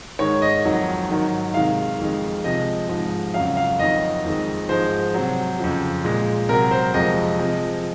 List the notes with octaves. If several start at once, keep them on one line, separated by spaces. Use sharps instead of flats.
G#2 D#3 G#3 C#5
D#5
F2 D#3 F#3
G#2 D#3 F#3
C3 D#3 G#3 F5
F2 D#3 G#3
C3 F3 G#3 D#5
G#2 F3 G#3
F2 C#3 F#3 F5
F5
F2 D#3 F#3 D#5
F2 D#3 G#3
G#2 F3 G#3 C5
C3 F#3
F2 C#3 F3
A#2 G#3
C3 F#3 A#4
C5
F2 C3 F3 G#3 D#5
C3 F3 G#3